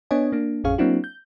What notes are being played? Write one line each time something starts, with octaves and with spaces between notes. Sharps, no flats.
B3 D4 C#5 D#5 G#5
A#3 D4
A1 F2 C#4 G#4 F5 C#6
F#3 A#3 C4 D4 E4 F#4
G6